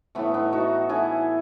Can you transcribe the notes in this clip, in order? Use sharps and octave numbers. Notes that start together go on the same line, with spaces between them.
A2 E3 A3 B3
B3 D#4
D#4 F#4
A2 E3 A3 E4 G#4